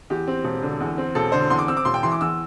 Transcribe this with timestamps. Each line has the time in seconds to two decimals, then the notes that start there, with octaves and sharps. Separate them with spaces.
0.10 E2 G4
0.27 C4
0.44 E1
0.63 D3
0.80 E2
0.98 C4
1.15 E1 A4
1.32 D3 C5
1.50 E2 C6
1.59 D6
1.68 C4 E6
1.77 D6
1.85 E1 C6
1.94 G5
2.03 E3 C6
2.12 D6
2.21 E2 E6